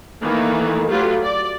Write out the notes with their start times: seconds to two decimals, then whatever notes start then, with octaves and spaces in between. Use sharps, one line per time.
0.23 D#3 E3 A3 A#3 E4
0.89 F#3 A3 F4 G4 B4
1.22 D5